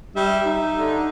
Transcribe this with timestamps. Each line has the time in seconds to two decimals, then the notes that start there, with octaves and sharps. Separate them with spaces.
0.16 G3 E5
0.45 D#4
0.78 D3